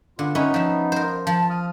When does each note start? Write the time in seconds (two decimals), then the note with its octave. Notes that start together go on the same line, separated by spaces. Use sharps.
0.19 D3 B3 F4
0.35 B3 C#4 D#4 E4 B4
0.54 F3 E5
0.92 A#4 C5
1.27 F3 A5
1.50 D#6 F6